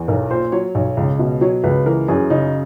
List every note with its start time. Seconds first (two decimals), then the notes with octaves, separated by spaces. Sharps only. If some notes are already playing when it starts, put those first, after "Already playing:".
Already playing: E2
0.08 B1 A#4
0.30 A#2 C5
0.52 F#3 C#5
0.75 B1
0.97 C#2
1.19 B2
1.41 F#3 C#5
1.64 C#2 B4
1.86 E3 A#4
2.08 F#2 G#4
2.30 C#3 D#4